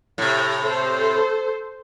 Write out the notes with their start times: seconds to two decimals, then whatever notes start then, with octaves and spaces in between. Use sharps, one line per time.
0.18 A2 C3
0.63 A4 C5